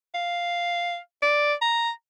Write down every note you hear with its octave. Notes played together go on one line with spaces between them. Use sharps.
F5
D5
A#5